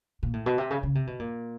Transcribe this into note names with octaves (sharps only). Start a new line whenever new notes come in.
A#2
A2
B2
C3
C#3
C#3
C3
B2
A#2